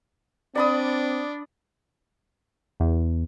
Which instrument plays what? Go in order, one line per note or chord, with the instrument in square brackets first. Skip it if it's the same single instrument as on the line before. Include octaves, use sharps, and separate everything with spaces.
[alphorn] C4 [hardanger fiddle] D4 [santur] D5 B5 D#6
[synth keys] E2